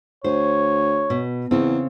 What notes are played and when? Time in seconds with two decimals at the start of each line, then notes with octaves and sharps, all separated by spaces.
0.24 D2 C5 C#5
1.10 B2
1.51 E2 C#3 C4